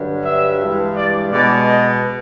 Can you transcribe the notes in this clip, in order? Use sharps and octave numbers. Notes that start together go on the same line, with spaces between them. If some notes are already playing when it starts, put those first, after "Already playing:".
Already playing: G2 D3 F#3
E5
G2 E3 G#3
D5
B2 G#3 D5
D#5